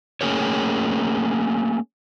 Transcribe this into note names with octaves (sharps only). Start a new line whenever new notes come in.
A3 A#3 C#4 G#4 A#4 C#5